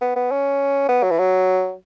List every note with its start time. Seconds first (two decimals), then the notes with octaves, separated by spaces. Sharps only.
0.01 B3
0.16 B3
0.31 C#4
0.89 B3
1.03 F#3
1.11 E3
1.19 F#3